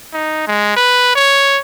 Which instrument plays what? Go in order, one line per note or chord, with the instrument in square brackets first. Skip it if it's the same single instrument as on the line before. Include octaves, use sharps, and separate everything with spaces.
[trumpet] D#4
G#3
B4
C#5